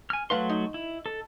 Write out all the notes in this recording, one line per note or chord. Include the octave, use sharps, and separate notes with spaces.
G#5 F6
F#3 A3 B4 F5 F#5 C6
D#4
E4
A4